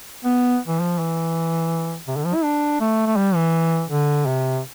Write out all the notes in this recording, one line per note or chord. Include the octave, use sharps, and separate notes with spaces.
B3
E3
F3
E3
C3
D3
F3
E4
D4
A3
A3
G3
E3
D3
C3